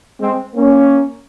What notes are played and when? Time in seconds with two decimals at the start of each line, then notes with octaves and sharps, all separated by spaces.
0.20 G#3 C4
0.55 A#3 C#4